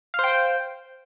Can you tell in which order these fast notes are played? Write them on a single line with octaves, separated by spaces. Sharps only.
F5 C5 G5